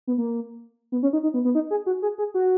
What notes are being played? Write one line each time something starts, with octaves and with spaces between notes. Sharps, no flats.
B3
A#3
B3
C#4
D#4
D#4
B3
B3
D#4
G#4
F#4
G#4
G#4
F#4